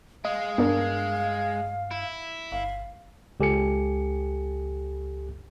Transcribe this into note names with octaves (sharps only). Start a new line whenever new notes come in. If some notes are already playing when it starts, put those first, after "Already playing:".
G#3 D#5 F5
G2 B3 D4 A#4
E4
G1 F5
C#2 G4 A4 G#5 C#7